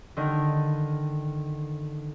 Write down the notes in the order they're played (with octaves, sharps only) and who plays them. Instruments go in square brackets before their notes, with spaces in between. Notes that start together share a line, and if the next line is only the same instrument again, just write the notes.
[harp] D3 D#3 D#4